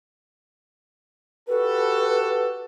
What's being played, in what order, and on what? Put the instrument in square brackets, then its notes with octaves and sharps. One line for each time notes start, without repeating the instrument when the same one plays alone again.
[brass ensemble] F#4 G4 A4 [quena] B4